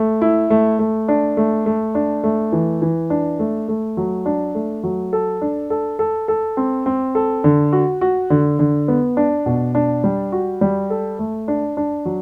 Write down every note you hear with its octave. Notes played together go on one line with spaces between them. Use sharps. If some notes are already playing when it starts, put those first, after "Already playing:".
Already playing: A3
E4
A3
A3
D4
A3
A3
D4
A3
E3
E3
D4
A3
A3
F#3
D4
A3
F#3
A4
D4
A4
A4
A4
C4
C4
A4
D3
F#4
F#4
D3
D3
B3
D4
B2
D4
G3
F#4
G3
A4
A3
D4
D4
F#3